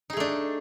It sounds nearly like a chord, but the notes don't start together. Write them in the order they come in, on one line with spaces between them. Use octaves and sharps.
D#4 G#4 A3 D4